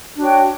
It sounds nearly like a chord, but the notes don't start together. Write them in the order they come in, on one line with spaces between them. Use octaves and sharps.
D4 F#4 C#5 G5